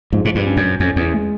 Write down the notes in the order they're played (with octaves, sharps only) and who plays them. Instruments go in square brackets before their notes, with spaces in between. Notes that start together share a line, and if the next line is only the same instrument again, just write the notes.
[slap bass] G#2 [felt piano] F3
[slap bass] G#2
G2
[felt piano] C#4
[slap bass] F#2
[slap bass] F2 [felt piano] C#4
[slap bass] E2
[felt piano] G#3